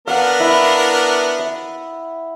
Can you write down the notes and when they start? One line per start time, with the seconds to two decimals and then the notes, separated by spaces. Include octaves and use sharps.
0.08 B3 D4 A#4 F5 F#5
0.40 E4
1.39 E5